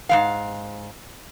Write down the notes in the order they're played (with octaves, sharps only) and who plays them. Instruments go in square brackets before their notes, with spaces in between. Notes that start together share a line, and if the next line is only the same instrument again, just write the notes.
[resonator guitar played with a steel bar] G#2 G#3 F5